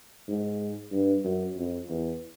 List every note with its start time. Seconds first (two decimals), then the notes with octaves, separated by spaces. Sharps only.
0.28 G#2
0.92 G2
1.25 F#2
1.57 F2
1.89 E2